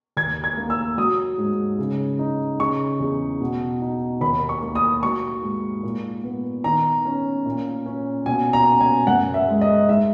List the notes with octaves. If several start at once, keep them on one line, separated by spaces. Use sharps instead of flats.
D#2 G#6
G#6
A#3
E6
F#3 D#6
G#2
C#3
D#4
C#3 C#6
E2
B2
D#4
D#2 B5
C#6
A#3
D#6
F#3 C#6
G#2
A#2
B3
D#3 A#5
C#4
A#2
C#4
B2 G#5
A#5
C#4
G#5
F#2 F#5
E5
G#3
D#5
G#2 E5